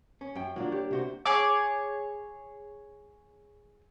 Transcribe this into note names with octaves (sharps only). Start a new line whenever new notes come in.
C#4
F#2 G5
A#3 D4 F4 F#4
G4 C#5
C3 F#4 C5
G#4 C#5 D6